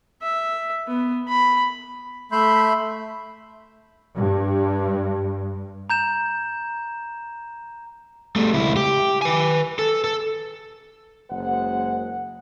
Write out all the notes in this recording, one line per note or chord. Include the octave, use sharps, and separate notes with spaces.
E5
B3
B5
A3 E5 B5 C6 G6
G2
A#5 G6 E7
G3 A3
C#2 E4
G4
B4 G#5
A4
A4
F#1 G#3 C5 F#5